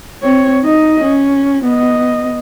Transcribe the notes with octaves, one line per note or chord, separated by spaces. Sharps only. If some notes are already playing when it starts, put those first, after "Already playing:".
C4 C#5
D#4 D#5
C#4
B3 D#5